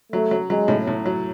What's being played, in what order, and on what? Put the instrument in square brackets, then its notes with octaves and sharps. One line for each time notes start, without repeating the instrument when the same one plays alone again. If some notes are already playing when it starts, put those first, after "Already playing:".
[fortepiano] F#3 [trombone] A3
[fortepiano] F#3
[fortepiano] F#3 [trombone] G#3
[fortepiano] A2
A2
F#3